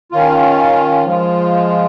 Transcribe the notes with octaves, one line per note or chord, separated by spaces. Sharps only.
D#3 C#4 F4
F3 G#3 F4